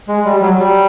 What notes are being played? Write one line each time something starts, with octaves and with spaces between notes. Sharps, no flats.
G#3
G3
G3
F#3
G3